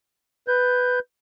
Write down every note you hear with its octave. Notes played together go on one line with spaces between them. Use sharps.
B4 G6